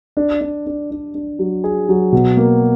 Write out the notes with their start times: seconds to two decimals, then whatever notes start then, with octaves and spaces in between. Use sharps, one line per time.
0.17 D4
0.41 D4
0.66 D4
0.91 D4
1.14 D4
1.39 F#3
1.64 G#4
1.89 F#3
2.12 B2
2.37 A#3